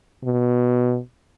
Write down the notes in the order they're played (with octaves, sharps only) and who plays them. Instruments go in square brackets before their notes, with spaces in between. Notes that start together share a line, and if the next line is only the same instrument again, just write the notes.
[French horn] B2